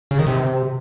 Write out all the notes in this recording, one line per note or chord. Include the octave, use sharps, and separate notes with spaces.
C#3
D#3
C3